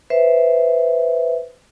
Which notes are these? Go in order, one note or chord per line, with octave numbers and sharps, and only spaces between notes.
B4 C5 E5